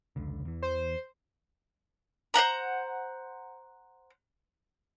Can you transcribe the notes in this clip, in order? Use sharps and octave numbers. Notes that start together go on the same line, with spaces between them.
F1 C#2 D3
E2 E3
C5
C5 D#5 F#5 A#5